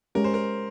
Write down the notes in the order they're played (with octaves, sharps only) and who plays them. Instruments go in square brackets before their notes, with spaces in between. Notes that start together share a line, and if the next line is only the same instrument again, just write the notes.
[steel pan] G#3 C#4 G4 [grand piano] A#4
[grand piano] C5
A#4